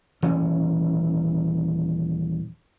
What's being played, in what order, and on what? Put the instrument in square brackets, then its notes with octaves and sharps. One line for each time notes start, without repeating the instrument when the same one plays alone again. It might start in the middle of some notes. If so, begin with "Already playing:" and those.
[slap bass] D#1 E3 C#4